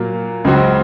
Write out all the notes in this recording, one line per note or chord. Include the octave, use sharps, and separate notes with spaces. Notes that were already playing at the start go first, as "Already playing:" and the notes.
Already playing: A#2 F#3 A#3
C#2 C#3 F#3 C4 F#4